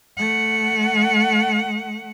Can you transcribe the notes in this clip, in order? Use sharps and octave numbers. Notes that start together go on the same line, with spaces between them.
A3 F#5